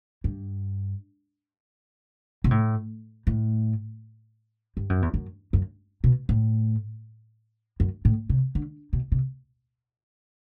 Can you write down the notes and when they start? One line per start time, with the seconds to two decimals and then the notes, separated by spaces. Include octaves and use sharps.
0.24 G2
2.44 B2
2.51 A2
3.27 A2
4.77 G2
4.90 F#2
5.02 E2
5.14 F#2
5.53 F#2
6.04 B2
6.29 A2
7.80 F#2
8.05 A2
8.29 C3
8.55 D3
8.93 B2
9.12 C3